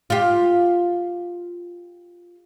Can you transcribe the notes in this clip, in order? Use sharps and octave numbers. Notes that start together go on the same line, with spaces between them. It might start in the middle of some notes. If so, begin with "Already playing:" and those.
F4 G4